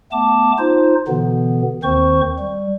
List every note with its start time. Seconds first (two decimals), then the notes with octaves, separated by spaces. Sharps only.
0.12 A3 B3 A5 D6
0.59 D#4 F4 C5
1.08 B2 D3 E3 B3
1.83 D#2 D#3 C4 C5 C#6
2.39 G3